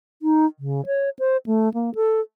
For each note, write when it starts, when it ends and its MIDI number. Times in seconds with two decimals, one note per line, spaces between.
0.22 0.46 63
0.59 0.85 49
0.86 1.10 73
1.19 1.37 72
1.46 1.72 57
1.74 1.94 58
1.95 2.20 69